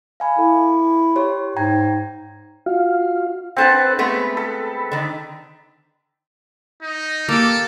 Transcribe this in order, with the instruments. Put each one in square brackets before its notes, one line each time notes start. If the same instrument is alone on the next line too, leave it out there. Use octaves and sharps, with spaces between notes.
[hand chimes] F5 G#5 B5
[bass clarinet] E4 [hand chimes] A4
[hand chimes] G4 C#5 C6
[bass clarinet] G#2 [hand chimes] G5 A#5 G#6
[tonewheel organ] F4 F#4 F5
[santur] C4 B4 [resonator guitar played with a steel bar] D4 A4 F#5 [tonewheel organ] C5
[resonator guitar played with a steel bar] G#3 A3 B3 [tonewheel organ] B5
[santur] A4
[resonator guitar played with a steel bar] D3 D#3
[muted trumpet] D#4
[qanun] A#3 G4 [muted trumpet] A4